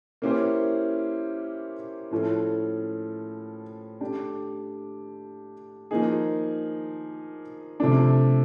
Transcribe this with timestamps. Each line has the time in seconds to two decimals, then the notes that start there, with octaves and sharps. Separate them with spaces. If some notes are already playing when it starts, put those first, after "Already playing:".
0.22 A#3 C#4 E4 G4 C5
2.11 A2 F3 A3 C#4
4.01 A3 D4 G4
5.91 F3 A#3 D#4 G#4
7.80 C3 F3 A3 D4